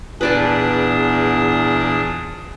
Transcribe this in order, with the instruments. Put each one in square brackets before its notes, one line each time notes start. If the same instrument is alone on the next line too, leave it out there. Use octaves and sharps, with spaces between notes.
[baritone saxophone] E2 [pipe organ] A#2 D4 D#6 [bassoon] G#4 [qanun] B4 D5 A5